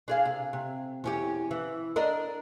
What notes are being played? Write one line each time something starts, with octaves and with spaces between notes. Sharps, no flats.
D4 G#4 F5
C3
C3
E2 C#4 G4
E3
D4 A#4 D#5